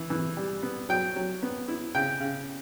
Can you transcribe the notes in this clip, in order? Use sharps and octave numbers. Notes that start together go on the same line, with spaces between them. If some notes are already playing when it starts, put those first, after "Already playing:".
Already playing: E3
E3
G3
B3
F#3 G5
F#3
B3
E4
C#3 G5
C#3